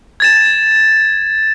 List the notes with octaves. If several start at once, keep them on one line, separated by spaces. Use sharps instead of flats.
G#6 A6 E7